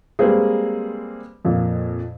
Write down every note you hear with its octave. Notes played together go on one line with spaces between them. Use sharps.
G3 G#3 A#3 C4 G#4 B4
F2 A#2